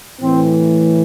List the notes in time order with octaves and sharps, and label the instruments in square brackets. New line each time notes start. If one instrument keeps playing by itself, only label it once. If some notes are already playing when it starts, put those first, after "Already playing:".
[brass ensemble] A2 E3 C4